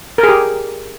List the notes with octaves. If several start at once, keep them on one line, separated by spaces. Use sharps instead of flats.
A#4
G#4
G4